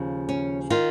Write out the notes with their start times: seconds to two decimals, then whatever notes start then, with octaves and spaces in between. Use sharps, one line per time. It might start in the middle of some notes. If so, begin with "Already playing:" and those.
Already playing: D#2 C#3 F3
0.29 C#4
0.70 D#3 F4